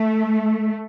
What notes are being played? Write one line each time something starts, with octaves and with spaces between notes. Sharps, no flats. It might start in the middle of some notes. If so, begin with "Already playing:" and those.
Already playing: A3